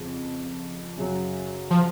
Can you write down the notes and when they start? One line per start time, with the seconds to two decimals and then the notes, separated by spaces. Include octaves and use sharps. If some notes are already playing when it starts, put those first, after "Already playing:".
Already playing: F2 C#3 F3
0.97 F#2 C#3 F#3
1.71 F3